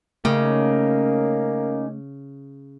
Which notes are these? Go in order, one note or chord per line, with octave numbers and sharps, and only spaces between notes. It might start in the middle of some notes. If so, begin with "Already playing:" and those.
C#3 A3 A#3 C#4 D#4 G4